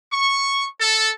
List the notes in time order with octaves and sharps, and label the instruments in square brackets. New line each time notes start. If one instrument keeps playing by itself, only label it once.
[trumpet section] C#6
A4